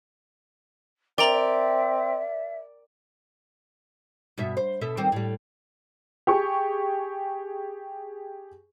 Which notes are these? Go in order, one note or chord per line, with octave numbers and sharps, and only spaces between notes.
C4 A#4 D5 E5 G5 A#5
G2 B2 E5
C5
B2 A4 E5
D#3 G3 C4
A2 G3
G4 G#4 C#6